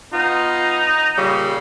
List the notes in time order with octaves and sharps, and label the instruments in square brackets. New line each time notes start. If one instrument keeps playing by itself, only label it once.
[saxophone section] B3 F4 [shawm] D#4
[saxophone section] A#2 C#3 G3